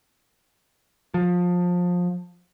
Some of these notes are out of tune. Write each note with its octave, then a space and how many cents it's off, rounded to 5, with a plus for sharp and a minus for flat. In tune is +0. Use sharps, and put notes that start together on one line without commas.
F3 +25